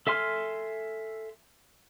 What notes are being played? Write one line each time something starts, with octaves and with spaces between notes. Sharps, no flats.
A4 E5 G#5 C6 F6